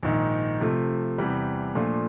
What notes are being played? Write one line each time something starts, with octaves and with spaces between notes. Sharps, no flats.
A#1 G#2 D#3
C3 F3 A3
E2 C3 E3 G3
A#2 F3 A3 D4 F4